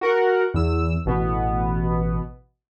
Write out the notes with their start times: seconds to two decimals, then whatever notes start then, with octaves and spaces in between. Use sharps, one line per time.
0.01 F#4 A#4 F#5
0.54 E2 E6
1.05 A1 B2 B3